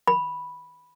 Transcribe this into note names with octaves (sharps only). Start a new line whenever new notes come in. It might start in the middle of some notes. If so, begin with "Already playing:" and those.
B5